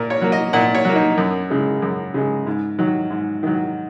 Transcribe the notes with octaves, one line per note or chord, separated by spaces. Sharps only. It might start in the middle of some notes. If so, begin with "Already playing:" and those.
Already playing: A#2 A#4
C#5
F#3 A#3
D#5
A#2 F#5
C#5
F#3 A#3
D#4
F#2
C#3 G#3
F#2
C#3 G#3
G#2
D#3 F#3
G#2
D#3 F#3